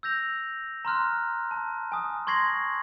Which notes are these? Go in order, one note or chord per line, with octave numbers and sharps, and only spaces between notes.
E6 G6 A#6 F7
A#5 C6 F6 F#6
A5
G#5 D#6
C6 C#6 G#6 A#6 C7 F#7